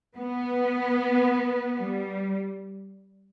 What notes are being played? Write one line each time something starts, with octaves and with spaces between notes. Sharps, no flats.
B3
G3